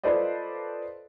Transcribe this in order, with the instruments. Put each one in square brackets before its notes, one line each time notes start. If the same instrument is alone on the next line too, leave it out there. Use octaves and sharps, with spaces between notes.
[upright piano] F4 A4 B4 C5 D5 D#5